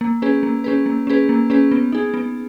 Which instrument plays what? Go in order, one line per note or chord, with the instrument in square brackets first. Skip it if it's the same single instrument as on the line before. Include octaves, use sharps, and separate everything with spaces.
[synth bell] A#3
C#4 G#4 B4
A#3
C#4 G#4 B4
A#3
C#4 G#4 B4
A#3
C#4 G#4 B4
B3
D#4 G#4
B3